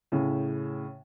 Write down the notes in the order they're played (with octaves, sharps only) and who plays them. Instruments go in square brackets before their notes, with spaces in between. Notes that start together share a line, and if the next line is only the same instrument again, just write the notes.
[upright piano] A2 C#3